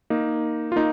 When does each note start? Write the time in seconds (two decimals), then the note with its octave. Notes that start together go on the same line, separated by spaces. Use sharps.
0.10 A#3 D#4
0.72 F4
0.76 A#3 D#4